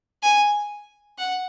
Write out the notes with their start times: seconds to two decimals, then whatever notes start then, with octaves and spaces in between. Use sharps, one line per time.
0.23 G#5
1.18 F#5